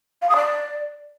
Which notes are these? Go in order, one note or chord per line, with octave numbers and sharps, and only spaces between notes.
F5
D#6
D5